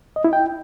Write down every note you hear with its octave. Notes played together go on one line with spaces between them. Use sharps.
D#5
E4
G5